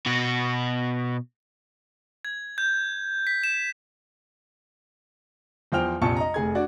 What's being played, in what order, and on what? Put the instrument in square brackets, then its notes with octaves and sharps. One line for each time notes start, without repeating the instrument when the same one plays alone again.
[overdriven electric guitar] B2 F#4
[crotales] G#6
G6
B6
E7
[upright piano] E2 F3 C5 G5 F6 F7
A#1 F2 C3 A5 C#6 C#7
D#5 A#5
F1 G#4 G#6
D4 F#4 D5